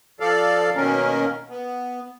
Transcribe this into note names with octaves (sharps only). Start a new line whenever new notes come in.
F3 A4 D5 F5
B2 D#3 A#3 C#4 A#4
B3